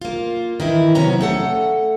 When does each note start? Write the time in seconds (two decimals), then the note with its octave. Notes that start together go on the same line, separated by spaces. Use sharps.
0.01 A#3 F4
0.60 D#3 E3 E4
0.95 C3 F#3 B3 C#4 A#5
1.21 A3 A4 F#5